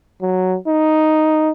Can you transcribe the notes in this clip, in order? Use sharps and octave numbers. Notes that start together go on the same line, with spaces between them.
F#3
D#4